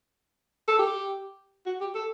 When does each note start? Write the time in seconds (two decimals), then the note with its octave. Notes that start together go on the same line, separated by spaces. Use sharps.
0.68 A4
0.79 G4
1.66 F#4
1.81 G4
1.95 A4